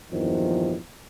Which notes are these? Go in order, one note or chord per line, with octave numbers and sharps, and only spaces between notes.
A#1 E2 G2 D#3 F3